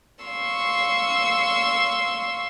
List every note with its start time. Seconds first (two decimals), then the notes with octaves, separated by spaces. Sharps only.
0.24 F5 C6 C#6 E6